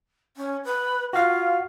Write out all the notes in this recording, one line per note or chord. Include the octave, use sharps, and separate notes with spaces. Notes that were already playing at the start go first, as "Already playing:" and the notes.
C#4
B4
F4 F#4 F5